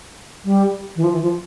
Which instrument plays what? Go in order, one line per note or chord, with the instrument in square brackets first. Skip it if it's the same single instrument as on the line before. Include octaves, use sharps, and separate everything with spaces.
[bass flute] G3
E3
F3
E3
F3